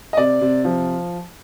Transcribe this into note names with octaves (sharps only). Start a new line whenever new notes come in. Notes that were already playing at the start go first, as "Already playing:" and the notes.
D#5
C3 D5
C3
F3